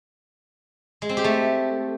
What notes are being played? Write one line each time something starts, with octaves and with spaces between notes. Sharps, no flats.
G#3
C4
G4
A3